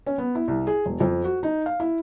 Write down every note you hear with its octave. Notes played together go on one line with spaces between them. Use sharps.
C#4
B3
E4
C2
G#4
E1
F2
F#4
D#4
F5
E4